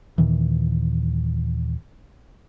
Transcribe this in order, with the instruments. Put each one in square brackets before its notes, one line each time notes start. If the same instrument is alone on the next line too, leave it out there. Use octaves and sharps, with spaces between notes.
[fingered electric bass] D#2 A#2 D#3 E3